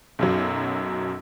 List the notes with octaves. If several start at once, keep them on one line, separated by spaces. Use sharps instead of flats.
B1 F#2 F#3